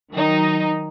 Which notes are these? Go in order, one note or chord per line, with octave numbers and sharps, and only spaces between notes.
D#3 F#3 D#4